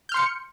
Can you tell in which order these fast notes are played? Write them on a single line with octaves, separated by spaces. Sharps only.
G6 F6 C6 C#7